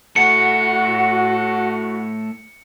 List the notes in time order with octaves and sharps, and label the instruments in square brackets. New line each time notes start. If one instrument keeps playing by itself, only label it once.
[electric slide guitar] A3 E4 A4 [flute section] F#4 [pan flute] F#5 [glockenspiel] C#7